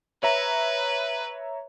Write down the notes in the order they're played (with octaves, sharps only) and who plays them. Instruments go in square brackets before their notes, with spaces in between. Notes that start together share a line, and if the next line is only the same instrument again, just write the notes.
[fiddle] B4 [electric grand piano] C#5 E5 A#5